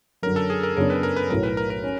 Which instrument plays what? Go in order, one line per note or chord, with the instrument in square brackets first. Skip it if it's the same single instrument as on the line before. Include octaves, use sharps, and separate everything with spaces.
[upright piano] F#2 D3 F#3 [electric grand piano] A#4
[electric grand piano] A4
G#4
A#4
[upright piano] F#2 C#3 F#3 B3 D4 [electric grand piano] A#4
[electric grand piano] B4
A#4
B4
[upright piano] B1 A2 F#3 [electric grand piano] A#4
[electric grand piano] B4
A#4
A#4
[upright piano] C#4